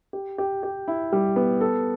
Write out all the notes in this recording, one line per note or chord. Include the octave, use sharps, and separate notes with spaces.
G4
G4
G4
E4
G3
B3
A4